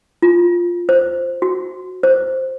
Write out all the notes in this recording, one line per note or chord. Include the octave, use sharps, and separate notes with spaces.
F4
C5
F#4
C5